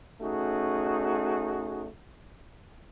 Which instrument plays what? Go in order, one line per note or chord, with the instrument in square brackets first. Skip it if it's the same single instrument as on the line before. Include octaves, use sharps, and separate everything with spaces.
[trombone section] A3 C#4 D#4 F#4 G#4